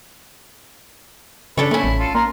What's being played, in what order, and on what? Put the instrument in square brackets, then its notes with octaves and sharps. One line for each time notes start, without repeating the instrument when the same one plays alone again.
[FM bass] C#3 [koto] D4 A4 C#5 [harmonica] B4
[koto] A3 C#4 [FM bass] A#3 [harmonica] E4
[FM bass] A1
[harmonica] F4 A4
[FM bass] A#3 [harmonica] A#4 C6